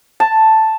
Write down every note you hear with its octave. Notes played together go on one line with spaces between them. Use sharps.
A5